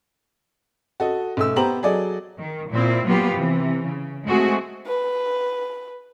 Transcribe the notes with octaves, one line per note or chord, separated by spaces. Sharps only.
F#4 A4 D#5
B1 A3 E6
B3 G4 C5 A#5 F#7
F#3 G#4 A4 D5 D#5
D#3
A#2 C4 E4
F#3 A#3 B3 F4 G4
C3 E3
C#3
G#3 A3 C4 F#4 G#4
B4